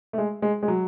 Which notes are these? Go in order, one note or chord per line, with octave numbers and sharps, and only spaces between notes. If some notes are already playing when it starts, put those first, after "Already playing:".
A3
G#3
G#3
G#3
F#3